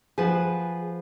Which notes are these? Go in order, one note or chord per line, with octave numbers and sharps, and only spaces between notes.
F3 G#4 B4 F#5